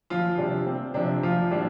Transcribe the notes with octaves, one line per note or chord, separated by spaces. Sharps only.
F3 F4
C3 G3 D4
C4
C3 F3 D4
F3 F4
A2 G3 D4